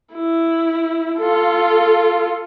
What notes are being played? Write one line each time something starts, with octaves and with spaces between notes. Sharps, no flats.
E4
F4 A4